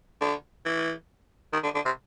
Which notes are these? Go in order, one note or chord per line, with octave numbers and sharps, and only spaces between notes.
D3
E3
D#3
D3
D3
C3